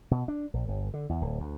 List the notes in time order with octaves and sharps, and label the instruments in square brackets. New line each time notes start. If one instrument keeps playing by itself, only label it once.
[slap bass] B2
D4
A#1
G1
D3
E2
D1
D2